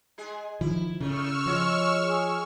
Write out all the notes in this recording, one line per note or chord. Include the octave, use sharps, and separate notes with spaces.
G#3 G#4
D#3 F3 E4
A2 C#3 A3 C#6 E6 F6
F3 G#3 F#4 C#5
G#4